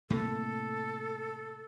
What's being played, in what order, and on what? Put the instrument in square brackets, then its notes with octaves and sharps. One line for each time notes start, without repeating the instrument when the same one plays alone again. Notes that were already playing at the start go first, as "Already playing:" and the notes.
[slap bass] A2 C3 A#3 [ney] A4